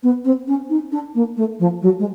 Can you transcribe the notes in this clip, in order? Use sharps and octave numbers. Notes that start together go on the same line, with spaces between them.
B3
C4
C#4
D#4
D4
A#3
A3
F3
F#3
G#3